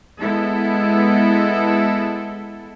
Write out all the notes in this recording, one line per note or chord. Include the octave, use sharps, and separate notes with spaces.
G#3 B3 E4 A4